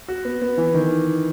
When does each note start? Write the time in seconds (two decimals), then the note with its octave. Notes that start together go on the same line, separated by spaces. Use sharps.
0.08 F#4
0.25 B3
0.42 B3
0.58 E3
0.74 D#3